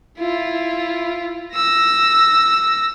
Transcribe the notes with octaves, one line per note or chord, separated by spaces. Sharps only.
E4 F4
E6 A#6